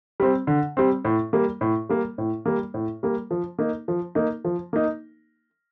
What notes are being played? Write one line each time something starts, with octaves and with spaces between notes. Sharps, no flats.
G3 C4
D3
G3 C4
A2
G3 A#3
A2
G3 A#3
A2
G3 A#3
A2
G3 A#3
F3
A#3 D#4
F3
A#3 D#4
F3
A#3 D#4